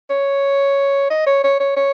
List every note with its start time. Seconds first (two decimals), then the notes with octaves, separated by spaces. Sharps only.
0.10 C#5
1.11 D#5
1.26 C#5
1.44 C#5
1.60 C#5
1.76 C#5